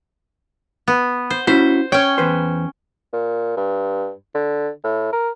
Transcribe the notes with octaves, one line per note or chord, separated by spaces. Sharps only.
B3
C5
C#4 E4 F#4 C5
C#4 C#5 G5
E2 B4 C5
A#2
G2
D3
A2
A#4